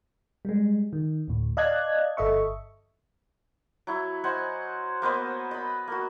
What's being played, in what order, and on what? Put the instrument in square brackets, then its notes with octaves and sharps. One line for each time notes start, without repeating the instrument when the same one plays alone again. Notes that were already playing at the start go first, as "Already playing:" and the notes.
[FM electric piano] G3 G#3
D#3
D2 A2
D5 D#5 F5 A5 F#6 G#6
G1 A4 D#5 E5 C#6
[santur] F#3 E4
C5 D#5 F#5 G#5
A#3 B3 C5 D#5
D#5 B5
A#3 F#4